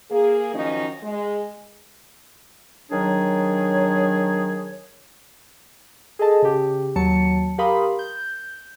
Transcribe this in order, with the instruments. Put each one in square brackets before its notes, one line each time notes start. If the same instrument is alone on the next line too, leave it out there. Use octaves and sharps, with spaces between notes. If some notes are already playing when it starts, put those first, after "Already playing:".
[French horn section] A#3 G#4
F#2 D#3 F3 C#4 D#4
G#3
[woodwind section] D#3 F#3 D4 G#4 C#5
[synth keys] G#4 A4 D#5 A5
C#3 G4
D#2 F#3 A5 C#7
G4 A#4 F5 B5 C6 D#6
G6